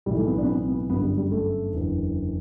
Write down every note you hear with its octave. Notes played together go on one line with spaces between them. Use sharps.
B1 A2 E3 G3
A3
B3
D4
B3
C4
B3
G1 F#2 D3 B3
G3
G3
A3
F#1 E2 D3